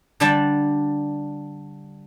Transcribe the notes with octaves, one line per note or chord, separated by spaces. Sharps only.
D3 G3 D4 D5 G5 A5